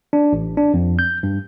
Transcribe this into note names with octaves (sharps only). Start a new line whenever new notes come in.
D4
A1
D4
F2
G6
G2